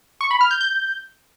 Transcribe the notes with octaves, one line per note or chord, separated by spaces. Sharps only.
C#6
B5
F6
G6
G6